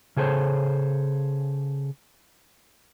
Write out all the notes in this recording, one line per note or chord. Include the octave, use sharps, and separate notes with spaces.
C#3 G#4 A4 C5 C#5